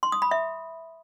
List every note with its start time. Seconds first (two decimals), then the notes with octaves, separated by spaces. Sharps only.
0.03 C6
0.12 D#6
0.22 B5
0.31 E5